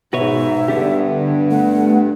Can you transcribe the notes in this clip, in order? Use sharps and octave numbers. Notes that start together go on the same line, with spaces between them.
G#2 B2 F#4 B4 C#5 E5
G2 D3 B3 D4 G4
A3 F#5